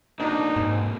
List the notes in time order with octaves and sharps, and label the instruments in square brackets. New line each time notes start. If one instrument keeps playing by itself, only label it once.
[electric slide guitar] A#3 C4 F#4 [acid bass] D4 [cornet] D#4
[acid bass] G#2